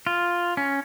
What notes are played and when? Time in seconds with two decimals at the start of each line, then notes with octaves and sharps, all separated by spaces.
0.07 F4
0.57 C#4